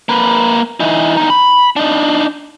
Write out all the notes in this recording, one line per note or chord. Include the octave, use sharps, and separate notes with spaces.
A#3 B4
E3 D#4
E2 D#4
B5
D4 D#4